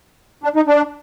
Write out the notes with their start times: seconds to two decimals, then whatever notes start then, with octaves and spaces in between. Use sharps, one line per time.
0.44 D4
0.56 D#4
0.67 D4